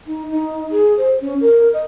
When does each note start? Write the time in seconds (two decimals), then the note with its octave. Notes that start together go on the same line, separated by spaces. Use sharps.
0.07 D#4
0.30 D#4
0.71 G#4
0.98 C5
1.21 C#4
1.41 A#4
1.73 D#5